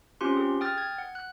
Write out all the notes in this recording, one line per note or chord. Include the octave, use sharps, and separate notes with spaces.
C4 C#4 F4 G4 C6
G#4
G5 D#6 F6 A6
G#6
F#5
F#6